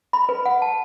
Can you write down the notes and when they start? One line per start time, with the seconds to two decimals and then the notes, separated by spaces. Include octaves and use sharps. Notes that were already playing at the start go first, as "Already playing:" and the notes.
0.13 B5
0.29 B4
0.46 F#5
0.62 A5